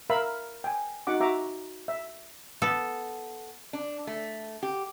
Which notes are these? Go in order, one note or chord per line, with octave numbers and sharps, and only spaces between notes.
A#4 E5 F5 B5
G5 G#5
D#4 F#4 F#5 D6
F#4 E5 A#5 D6
E5
B3 A4
D4
A3
G4